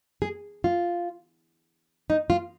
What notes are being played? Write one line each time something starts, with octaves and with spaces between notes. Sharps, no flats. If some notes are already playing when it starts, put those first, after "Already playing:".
G#4
F4
D#4
F4